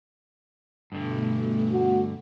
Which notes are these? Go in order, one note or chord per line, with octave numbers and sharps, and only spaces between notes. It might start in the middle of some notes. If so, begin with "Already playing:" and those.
G2 B2 D3 A3
F#4